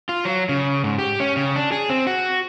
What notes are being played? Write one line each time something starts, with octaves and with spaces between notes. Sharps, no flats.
F4
F#3
C#3
G#2
G4
C#4
C#3
D4
G#4
C4
F#4